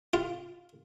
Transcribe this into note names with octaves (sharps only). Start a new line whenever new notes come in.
F4